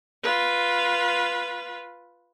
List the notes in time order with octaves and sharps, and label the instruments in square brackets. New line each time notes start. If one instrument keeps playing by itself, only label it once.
[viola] F4 B4